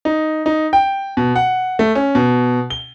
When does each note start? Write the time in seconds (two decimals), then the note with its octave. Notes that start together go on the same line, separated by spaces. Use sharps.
0.05 D#4
0.46 D#4
0.73 G5
1.17 B2
1.35 F#5
1.79 A3
1.95 C#4
2.15 B2
2.70 G7